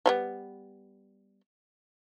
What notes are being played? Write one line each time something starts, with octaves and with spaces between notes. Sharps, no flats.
F3 G3 B3